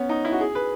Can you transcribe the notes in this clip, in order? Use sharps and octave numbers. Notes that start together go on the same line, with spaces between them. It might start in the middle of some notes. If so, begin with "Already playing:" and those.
Already playing: B3 C#4
D#4
E4
F#4
G#4
B4